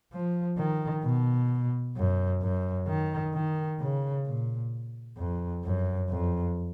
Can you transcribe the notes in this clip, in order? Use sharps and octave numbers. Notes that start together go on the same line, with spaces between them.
F3
D#3
B2
F#2
F#2
D#3
D#3
C#3
A#2
F2
F#2
F2